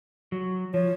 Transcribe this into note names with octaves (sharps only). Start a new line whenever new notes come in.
F#3
F3 C#5